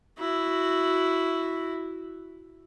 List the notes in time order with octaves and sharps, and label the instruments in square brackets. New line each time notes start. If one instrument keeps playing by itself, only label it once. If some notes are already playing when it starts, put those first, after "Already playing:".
[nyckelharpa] E4 F#4